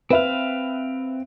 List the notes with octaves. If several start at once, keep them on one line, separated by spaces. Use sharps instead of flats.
C4 B4 E5 F5